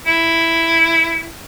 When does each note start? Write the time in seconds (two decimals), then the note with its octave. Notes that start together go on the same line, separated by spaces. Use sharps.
0.06 E4